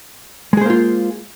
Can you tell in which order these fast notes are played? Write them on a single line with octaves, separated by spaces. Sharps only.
G#3 G#4 C5 A#3 F4